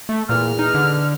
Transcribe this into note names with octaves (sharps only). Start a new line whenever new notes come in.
A3
E2 A#2 F6
D#4
D3